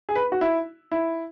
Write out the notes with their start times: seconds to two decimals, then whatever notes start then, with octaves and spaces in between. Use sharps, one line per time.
0.09 G#4
0.15 B4
0.32 F#4
0.41 E4
0.92 E4